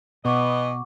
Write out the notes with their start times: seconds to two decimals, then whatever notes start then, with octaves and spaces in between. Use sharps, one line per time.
0.25 B2 E3 B3 D#5 F#5 C#6 D6